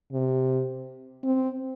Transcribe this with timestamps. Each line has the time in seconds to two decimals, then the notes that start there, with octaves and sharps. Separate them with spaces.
0.13 C3
1.23 C4